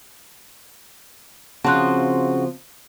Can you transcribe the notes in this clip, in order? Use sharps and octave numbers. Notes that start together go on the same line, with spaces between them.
C#3 F3 C4 F#4 A5 C6 F#6